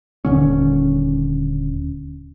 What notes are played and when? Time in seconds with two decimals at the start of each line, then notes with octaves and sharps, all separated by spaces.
0.25 D#1 D3 C#4